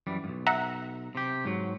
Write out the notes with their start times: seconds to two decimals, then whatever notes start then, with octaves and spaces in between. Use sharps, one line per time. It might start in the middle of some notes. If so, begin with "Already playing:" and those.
0.07 F#2 E3 G3
0.24 B1 G2
0.47 E5 F#5 A#5
1.15 C3 G4
1.45 G#2 F#3